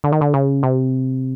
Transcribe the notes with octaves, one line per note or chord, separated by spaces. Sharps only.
D3
D#3
D3
C#3
C3